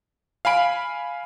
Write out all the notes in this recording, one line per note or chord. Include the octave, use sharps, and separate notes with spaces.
F5 G#5 B5 D7